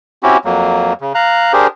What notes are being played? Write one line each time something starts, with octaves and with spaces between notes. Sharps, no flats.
C4 C#4 E4 F#4 G4
F2 F#3 A#3
C#3
F5 A#5 F#6
D4 G4 G#4 A#4 C5